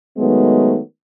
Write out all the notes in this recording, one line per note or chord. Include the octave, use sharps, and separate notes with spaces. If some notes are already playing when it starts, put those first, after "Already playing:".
D#3 F#3 G#3 A3 B3